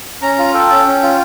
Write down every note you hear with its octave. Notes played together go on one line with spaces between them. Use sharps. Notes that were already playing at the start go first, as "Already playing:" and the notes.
C#4 A#5
F4
A4 G5
C#4
C#4
F4